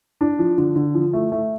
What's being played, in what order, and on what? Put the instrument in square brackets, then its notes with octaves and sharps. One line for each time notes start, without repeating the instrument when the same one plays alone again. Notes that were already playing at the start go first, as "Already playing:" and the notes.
[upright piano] D4
F3
D3
D3
F3
A3
A3